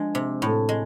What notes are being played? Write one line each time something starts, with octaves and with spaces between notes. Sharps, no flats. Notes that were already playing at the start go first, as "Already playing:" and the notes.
Already playing: F3 G#3 D4
C3
A2
G#3